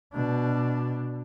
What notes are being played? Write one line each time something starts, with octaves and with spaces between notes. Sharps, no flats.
B2 D4